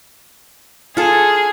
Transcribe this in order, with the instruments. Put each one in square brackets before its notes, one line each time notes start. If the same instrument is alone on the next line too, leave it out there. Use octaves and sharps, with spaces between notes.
[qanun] F4 A4 [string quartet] G#4